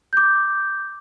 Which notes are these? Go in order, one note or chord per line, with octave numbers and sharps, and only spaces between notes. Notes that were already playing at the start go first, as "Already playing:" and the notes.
D6 G6